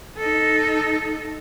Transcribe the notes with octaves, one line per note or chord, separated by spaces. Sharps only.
D#4 A4